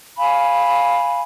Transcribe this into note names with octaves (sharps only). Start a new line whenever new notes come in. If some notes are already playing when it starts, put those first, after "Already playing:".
F5 G#5 B5